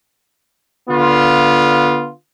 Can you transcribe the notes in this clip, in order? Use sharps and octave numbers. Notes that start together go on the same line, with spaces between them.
D3 B3 F4